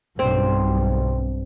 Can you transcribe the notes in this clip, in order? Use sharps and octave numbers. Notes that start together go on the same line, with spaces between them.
B1 G2 C4